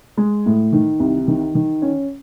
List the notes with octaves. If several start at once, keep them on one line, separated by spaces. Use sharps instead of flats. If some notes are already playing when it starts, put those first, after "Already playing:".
G#3
A2
D#3
C2
D#3
D#3
C#4